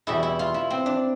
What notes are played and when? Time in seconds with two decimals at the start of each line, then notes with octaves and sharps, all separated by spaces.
0.07 E2 B2 G3 E4
0.23 E4
0.39 F4
0.54 E4
0.70 C4
0.86 D4